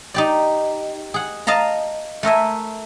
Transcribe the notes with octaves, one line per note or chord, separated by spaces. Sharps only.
D#4 G4 D5
G#4 F#5
D#5 F5 A5 A#5
A3 A#4 E5 G#5